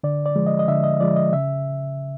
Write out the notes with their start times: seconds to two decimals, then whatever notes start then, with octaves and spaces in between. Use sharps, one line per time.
0.04 D3 D5
0.26 D5
0.36 F3 G#3
0.47 D#5
0.59 D#5
0.68 D3 E5
0.84 D#5
1.00 F3 G#3 D5
1.16 D#5
1.33 C#3 E5